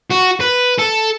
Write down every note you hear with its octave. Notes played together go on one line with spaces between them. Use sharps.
F#4
B4
A4